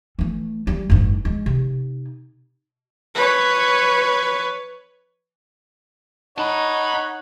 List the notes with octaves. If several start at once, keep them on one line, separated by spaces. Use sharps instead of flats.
E3 A3
G3
F#1 G#2
G#3
C3 D#4
B4 C#5
D#4 C#5 F#5 A5 B5